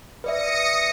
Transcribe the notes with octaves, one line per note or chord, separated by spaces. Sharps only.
B4 D5 E5 D#6 A#6 C#7